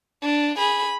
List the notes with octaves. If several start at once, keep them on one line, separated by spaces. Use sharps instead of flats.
D4
G#4 B5